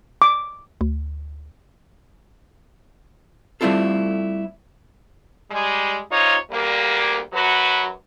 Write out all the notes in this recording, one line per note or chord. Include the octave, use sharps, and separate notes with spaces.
D6
D2
G3 A3 C4 E4 F4 A4
G3 G#3
C3 D#4 F4 C#5
D2 G3 A#3
F#2 F#3 F#4 B4